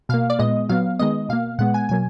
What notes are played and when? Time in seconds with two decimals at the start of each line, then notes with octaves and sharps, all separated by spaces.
0.09 B2 A#3 F5
0.30 D5
0.39 A#2 G#3 B3 D#5
0.69 A#2 F#3 B3 F5
0.99 D#3 G#3 B3 D#5
1.29 B2 A#3 F5
1.59 A#2 G#3 B3 F#5
1.74 G#5
1.89 B2 F#3 A#3 G#5